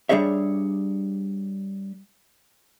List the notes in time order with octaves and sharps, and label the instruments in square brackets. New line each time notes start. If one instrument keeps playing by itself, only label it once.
[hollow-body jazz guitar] G3 D4 G#4 C#5 E5